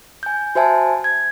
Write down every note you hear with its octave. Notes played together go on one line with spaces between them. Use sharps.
G#5 G6
F#4 C5 E5 G#5 A5
G#6